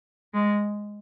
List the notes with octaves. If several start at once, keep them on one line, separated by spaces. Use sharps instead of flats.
G#3